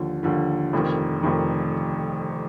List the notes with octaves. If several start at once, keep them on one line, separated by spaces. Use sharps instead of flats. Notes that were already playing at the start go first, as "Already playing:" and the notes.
Already playing: D#2 D3 F3
D#2 D3 F3
F1 F2 D#3
F1 F2 D#3